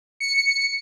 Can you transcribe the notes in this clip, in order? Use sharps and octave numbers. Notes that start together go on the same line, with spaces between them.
C#7